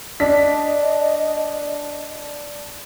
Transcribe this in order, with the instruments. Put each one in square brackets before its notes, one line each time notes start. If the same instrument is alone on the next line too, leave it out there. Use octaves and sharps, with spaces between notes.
[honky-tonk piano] D4 B6 [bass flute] D#5